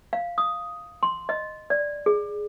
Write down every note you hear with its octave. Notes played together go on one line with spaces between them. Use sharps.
F5
D#6
C6
D#5
D5
G#4